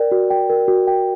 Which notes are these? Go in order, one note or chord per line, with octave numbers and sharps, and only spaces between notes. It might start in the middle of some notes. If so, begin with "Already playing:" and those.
Already playing: A#4 D5 G5
F#4
G5
A#4
F#4
G5